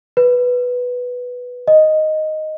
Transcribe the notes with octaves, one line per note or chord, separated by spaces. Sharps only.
B4
D#5